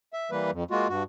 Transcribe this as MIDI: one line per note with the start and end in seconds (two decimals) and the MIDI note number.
0.13 0.31 76
0.31 0.51 52
0.31 0.51 55
0.31 0.51 58
0.31 0.51 71
0.52 0.64 41
0.71 0.88 56
0.71 0.88 58
0.71 0.88 65
0.71 0.88 66
0.89 1.03 43
0.89 1.03 66